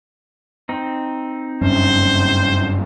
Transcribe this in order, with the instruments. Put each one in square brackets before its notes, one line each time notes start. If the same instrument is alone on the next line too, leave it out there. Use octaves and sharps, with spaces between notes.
[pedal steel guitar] C4 D#4
[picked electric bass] F#1 G2 C#4 [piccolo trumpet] C5